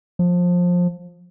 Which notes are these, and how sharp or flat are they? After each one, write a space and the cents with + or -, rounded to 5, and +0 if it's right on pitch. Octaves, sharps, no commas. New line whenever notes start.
F3 +20